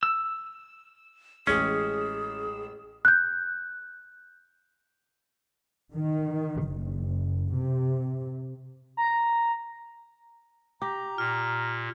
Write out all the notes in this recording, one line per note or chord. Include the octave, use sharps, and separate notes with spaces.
E6
A1 G#3 C#4 G#4
F#6 G6
D#3
F#1
C3
A#5
G4 A#5
A#2 F6